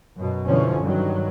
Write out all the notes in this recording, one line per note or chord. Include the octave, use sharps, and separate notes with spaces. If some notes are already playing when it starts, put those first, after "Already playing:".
F#2 B2
B2 D3 E3 F3 C#4
G2 D#3 F#3